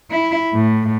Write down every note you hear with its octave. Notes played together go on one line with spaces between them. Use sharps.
E4
A2